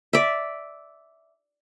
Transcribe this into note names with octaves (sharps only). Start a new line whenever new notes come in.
D5 E5